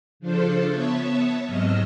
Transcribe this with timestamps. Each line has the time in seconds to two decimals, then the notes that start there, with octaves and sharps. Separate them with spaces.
0.20 C#3 F3 D4 F4 A4 C5
0.68 B3 C#5 E5 A5
1.45 G#2 C3 F#3 D#5 E6 F6